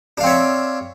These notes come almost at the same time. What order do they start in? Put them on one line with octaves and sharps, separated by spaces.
D4 F5 C4 C#5 E5